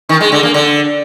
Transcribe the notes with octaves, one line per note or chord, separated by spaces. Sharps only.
D#3
G#3
D3
A#3
D3